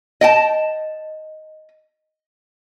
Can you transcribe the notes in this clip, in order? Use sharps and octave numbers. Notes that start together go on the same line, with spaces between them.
D#5 G5 A5